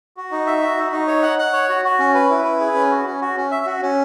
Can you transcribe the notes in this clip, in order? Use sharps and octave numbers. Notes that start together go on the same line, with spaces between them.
F#4
D#4
E5
F#4
D#4
D#4
C#5
F#5
F#5
C#5
F#4
F#4
C#4
B4
E4
B4
G#4
C#4
F#4
C#4
F#4
C#4
E5
F#4
C#4